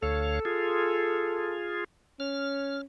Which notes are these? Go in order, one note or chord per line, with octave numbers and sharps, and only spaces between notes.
D2 A4 C#5 F5
F4 G#4
C#4 F6